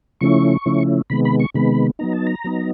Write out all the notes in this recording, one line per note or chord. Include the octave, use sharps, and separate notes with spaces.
C#3 F3 A3 C#4 E4 C#6
C#3 F3 A3 C#4 E4
C3 D#3 G#3 B3 B5
B5
C#6
C3 D#3 G#3 B3 B5
F#3 B3 D#4 A#5
A5
A#5
F#3 B3 D#4